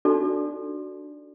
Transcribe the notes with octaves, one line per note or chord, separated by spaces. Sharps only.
D4 D#4 F4 F#4 A4 D5